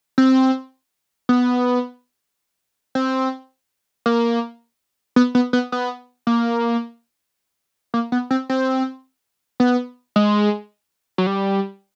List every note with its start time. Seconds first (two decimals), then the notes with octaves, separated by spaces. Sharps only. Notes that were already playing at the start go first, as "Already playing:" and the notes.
0.18 C4
1.29 B3
2.95 C4
4.06 A#3
5.16 B3
5.35 B3
5.53 B3
5.72 B3
6.27 A#3
7.94 A#3
8.12 B3
8.31 C4
8.50 C4
9.60 B3
10.16 G#3
11.18 F#3
11.27 G3